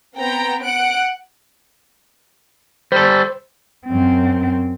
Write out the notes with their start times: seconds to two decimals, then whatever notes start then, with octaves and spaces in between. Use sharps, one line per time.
0.17 B3 C4 G5 A#5
0.65 F#5 F#6 D7
2.92 G3 A4 C5
3.87 F#2 C4